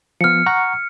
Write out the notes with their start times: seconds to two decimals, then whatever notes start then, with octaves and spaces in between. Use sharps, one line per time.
0.21 F3 B3 F6 C#7
0.46 F#5 A#5 C#6